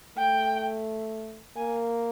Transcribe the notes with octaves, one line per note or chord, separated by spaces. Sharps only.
A3 G5
A#3 G#5